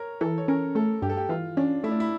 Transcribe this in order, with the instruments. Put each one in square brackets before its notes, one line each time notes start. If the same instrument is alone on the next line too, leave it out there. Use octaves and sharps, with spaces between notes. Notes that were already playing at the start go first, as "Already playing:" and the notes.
Already playing: [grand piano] A#4 C#5
[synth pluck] E3 [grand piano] A4
[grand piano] C#5
[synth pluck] C#4 [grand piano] A#4
[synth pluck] A3 [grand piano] A4
[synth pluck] G2 [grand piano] G4
[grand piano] A4
G4
[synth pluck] E3 [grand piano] F4
[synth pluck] C#4 [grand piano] D4
[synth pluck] A3 [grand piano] E4
[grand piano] D4
E4